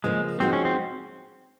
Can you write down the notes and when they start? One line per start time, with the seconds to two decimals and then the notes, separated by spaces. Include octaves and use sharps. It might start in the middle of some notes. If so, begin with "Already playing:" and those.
0.04 C#3 F3 G#3 A#3
0.40 F3 G#3 C4 D#4 F#4 C5
0.53 C#4
0.65 C4